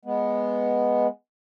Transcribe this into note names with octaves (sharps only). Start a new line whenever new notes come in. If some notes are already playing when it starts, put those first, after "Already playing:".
G#3 B3